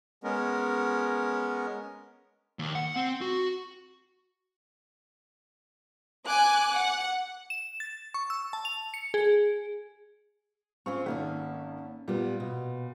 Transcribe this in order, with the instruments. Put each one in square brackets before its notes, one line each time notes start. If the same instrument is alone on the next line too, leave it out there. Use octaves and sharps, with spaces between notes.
[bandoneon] G#3 B3 C#4 A#4
[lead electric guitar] D#2
F#5
C4
F#4
[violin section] G#5 D6 F#6
F#5
[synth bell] E7
A6
C#6
E6
A5
F7
C#7
G#4
[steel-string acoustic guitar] C4 F4 C5 [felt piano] C#4 C#6
[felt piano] G#1 [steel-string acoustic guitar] A#3 C#4 A4
[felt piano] A#2 [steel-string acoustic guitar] G3 B3
[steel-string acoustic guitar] B2